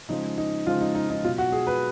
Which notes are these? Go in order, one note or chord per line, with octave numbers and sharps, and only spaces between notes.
C#3 F3 G#3 D#4
D#4
C#3 F3 G#3 F4
D#4
D#4
D#4
B2 F#3 F4
F#4
G#4
B4